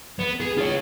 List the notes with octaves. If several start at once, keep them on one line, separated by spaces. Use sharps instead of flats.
B3
G#4
F4 C#5